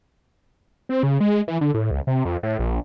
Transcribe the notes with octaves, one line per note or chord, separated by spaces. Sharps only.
C4
C#3
G#3
E3
D3
A2
C#2
C3
F2
A2
A#1